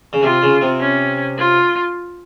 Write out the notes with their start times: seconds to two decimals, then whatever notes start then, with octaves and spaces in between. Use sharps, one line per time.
0.13 C#3
0.22 C3 F4
0.42 C#3
0.61 C3
0.80 C#4
1.38 F4